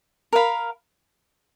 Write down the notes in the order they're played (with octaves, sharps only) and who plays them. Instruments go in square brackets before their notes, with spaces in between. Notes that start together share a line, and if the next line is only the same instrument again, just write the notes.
[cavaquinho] A#4 F5 B5